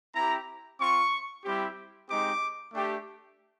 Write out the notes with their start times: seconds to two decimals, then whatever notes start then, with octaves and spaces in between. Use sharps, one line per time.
0.15 C4 E4 G4 A#5
0.80 C4 F4 C#6
1.44 G3 C4 E4 G4
2.09 G#3 C4 D#4 G4 D6
2.74 A3 D4 G4